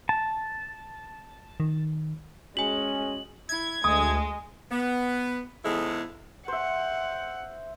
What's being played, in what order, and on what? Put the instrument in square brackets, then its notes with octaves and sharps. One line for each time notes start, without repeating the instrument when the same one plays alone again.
[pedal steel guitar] A5
[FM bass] D#3
[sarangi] G#3 [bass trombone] C#4 [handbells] F#4 G#5 [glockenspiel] F#7
[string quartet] E4 [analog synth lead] G#6
[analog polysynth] D2 A3 [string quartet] G#3 D#5 [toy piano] D#6
[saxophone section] B3
E2 G#2 C#3 G#3 E4 A4
[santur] C5 E5 [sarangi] F#5